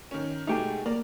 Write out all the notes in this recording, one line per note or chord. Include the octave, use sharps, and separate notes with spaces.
D#3 C#4
B2 G#3 A3 D#4 G4 G#4
A#3 D5